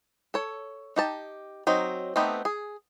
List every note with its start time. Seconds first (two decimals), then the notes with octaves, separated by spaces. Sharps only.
0.34 A4 C#5
0.96 D#4 G4 A5
1.67 F#3 C4 D#4
2.16 A3 B3 C4 D#4 G4
2.45 G#4